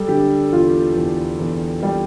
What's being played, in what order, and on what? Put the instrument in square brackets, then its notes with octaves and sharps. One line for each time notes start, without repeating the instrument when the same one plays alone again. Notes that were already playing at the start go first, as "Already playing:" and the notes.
Already playing: [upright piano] G3 A4
D3 G4
E2 F4
E2
E2
G3